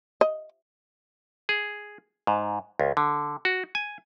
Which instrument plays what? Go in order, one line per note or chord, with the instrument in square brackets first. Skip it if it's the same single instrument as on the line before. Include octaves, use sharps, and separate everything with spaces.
[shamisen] D#5
[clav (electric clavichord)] G#4
G#2
C#2
D3
F#4
G#5